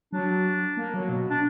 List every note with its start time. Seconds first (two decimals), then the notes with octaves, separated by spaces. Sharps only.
0.13 F#3 D4
0.77 A#3
0.94 F#3
1.09 B2
1.30 D4